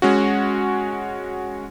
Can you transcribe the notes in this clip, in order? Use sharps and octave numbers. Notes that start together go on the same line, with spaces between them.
G#3 C#4 F#4